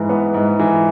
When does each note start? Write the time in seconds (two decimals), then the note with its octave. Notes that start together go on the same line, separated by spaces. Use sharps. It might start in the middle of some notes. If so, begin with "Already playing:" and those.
Already playing: G#2 E3 B4
0.09 B3
0.34 G#2
0.59 E3